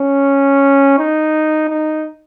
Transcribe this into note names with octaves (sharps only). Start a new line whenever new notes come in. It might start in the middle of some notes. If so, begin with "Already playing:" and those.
Already playing: C#4
D#4
D#4